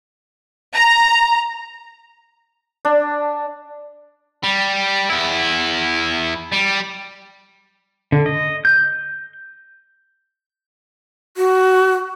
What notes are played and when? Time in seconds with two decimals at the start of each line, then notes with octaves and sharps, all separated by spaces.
0.74 A#5
2.85 D4
4.44 G3
5.10 E2 E4
6.52 G3
8.12 D3
8.26 D#5
8.65 G6
11.37 F#4